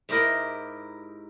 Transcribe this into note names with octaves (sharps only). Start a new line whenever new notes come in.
G#2 E4 G4 A#4 D#5 B5